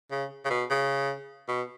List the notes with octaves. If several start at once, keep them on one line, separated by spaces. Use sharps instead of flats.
C#3
C#3
B2
C#3
B2